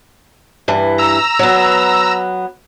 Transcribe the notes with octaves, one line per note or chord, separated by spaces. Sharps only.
G2 E3
A#5 E6
F#3 B3